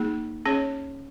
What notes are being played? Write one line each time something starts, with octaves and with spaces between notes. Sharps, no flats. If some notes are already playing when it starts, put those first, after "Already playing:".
Already playing: A#3 D#4 G#4
C#4 G#4 C#5